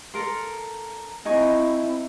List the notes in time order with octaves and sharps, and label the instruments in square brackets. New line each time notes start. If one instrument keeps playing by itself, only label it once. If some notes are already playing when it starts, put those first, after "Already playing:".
[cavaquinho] A4 A#4 C6
[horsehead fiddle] C4 E4 [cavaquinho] D#4 G#5 C#6